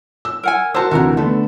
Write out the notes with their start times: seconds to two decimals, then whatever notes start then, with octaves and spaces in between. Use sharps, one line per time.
0.25 E6
0.43 A#4 F#5 G#5
0.74 F#4 A#4 C5 A5 E6
0.91 D2 C3 E3 F#4 A#4 A#5
1.17 D3 A3 B3 A4